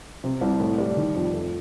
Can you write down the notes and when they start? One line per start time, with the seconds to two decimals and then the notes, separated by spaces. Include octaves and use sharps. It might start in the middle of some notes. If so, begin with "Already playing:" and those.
0.24 C3
0.41 C2
0.60 A2
0.78 G3
0.97 D#3
1.15 F2
1.34 A3